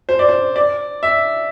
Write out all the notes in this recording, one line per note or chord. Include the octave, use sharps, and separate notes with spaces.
C5
D5
C5
D5
E5